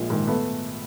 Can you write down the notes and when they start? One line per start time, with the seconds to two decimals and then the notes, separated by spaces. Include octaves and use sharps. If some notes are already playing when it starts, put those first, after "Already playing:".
Already playing: A#1 G#3 A#3
0.10 G#2 D#3
0.27 A3 B3